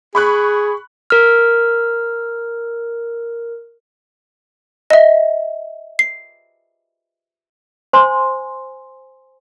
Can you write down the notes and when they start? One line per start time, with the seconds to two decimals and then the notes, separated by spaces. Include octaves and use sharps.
0.15 G#4 B5 C#6 F#6
1.10 A#4 F6
4.90 D#5 E5
5.99 C7
7.93 C5 G#5 C6